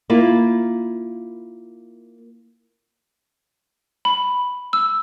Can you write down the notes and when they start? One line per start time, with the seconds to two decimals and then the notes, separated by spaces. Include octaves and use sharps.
0.10 A#3 E4 F4
4.05 B5
4.73 E6